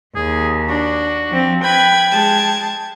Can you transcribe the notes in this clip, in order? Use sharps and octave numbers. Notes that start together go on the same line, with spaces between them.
D#2 G#4
D4 F#4
F3 C4
B4 G5 B5 G#6
G#3 A5